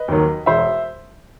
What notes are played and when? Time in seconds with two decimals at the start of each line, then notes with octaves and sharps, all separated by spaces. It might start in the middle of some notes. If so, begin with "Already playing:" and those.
Already playing: B4 D#5
0.08 D#2 D#3 F#3
0.46 E1 C5 E5